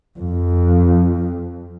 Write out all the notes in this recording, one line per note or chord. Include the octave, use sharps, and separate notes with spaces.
F2